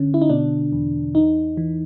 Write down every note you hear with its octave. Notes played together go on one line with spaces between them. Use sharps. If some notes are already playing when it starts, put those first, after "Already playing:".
Already playing: G1 D3 C#4
E4
D#4
B2 D4
E2
E2 D#4
E3